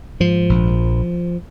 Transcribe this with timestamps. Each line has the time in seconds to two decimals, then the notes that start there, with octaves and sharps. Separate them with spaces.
0.20 G#2 F3
0.49 A#1